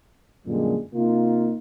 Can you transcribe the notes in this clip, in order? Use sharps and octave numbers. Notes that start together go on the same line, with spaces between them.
F#2 A#2 D3 G3 G#3
C3 A#3 D#4 F4